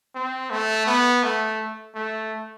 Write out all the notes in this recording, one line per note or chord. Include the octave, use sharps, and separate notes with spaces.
C4
A3
B3
A3
A3